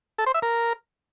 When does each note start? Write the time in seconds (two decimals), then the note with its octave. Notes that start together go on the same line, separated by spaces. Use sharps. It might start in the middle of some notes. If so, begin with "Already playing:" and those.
0.18 A4
0.26 C5
0.34 E5
0.42 A#4